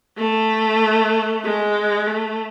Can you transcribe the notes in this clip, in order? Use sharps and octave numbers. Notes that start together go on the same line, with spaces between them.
A3
G#3
A3